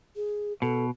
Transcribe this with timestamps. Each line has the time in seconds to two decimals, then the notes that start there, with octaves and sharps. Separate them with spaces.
0.16 G#4
0.62 B2 A4